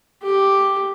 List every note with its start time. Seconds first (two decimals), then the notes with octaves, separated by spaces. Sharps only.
0.24 G4